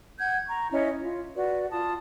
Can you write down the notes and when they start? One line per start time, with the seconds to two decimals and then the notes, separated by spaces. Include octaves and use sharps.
0.18 F#5 G6 G#6
0.48 A#5 C#6
0.71 C#4 E4 D#5
1.00 F4
1.35 F#4 B4 D5
1.70 F4 A5 D#6